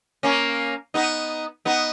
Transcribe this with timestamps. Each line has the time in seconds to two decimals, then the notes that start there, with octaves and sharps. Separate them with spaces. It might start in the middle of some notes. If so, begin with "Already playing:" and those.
0.23 A#3 C#4
0.94 B3 D#4
1.65 B3 D#4